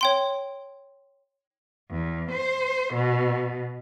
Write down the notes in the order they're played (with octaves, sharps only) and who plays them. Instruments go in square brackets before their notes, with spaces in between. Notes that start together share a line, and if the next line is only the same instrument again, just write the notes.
[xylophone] C#5 G5 C6
[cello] E2
C5
B2